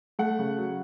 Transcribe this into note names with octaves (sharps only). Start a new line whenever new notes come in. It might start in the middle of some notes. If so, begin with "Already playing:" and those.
A3 F#5
C#3
F#3